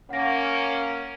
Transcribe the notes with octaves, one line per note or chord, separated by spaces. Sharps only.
A#3 C#4 F#5 A#6